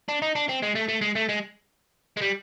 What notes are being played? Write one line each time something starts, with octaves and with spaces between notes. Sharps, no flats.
D4
D#4
D4
C4
G#3
A3
A3
G#3
A3
G#3
G#3
G3